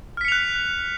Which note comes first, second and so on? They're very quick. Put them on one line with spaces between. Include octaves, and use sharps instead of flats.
F6 B6 C#7 F7 F#6